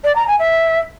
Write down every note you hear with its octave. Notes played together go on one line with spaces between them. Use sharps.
D5
A#5
G#5
E5